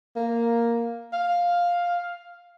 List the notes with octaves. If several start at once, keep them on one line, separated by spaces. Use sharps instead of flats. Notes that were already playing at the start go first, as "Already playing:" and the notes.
A#3
F5